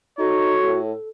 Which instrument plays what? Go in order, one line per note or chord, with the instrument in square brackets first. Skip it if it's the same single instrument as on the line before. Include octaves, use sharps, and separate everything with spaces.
[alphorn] D#4 [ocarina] F#4 [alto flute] A4 [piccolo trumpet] C#5
[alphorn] A2